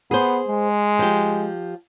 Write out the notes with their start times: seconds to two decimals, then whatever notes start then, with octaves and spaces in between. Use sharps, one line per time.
0.11 B3 G#4 C5
0.48 G#3
0.99 F3 G4